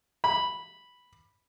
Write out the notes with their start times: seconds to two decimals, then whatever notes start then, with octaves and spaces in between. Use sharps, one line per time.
0.24 B5